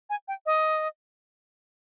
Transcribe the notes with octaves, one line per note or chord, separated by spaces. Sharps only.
G#5
G5
D#5